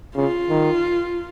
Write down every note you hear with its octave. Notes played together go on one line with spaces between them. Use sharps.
C#3 F4
D#3